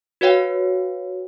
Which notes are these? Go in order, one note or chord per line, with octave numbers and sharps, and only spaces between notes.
F#4 B4 C#5 F5 G5